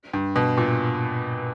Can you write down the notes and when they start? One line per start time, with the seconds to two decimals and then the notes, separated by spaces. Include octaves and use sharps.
0.13 G2
0.36 B2
0.58 A#2